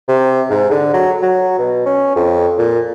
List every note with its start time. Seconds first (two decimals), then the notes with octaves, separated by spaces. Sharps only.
0.08 C3
0.49 G#2
0.71 D3
0.93 F#3
1.22 F#3
1.59 B2
1.86 C#4
2.16 F2
2.58 A#2